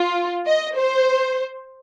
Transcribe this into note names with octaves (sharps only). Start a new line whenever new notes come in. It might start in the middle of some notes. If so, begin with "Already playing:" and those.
Already playing: F4
D#5
C5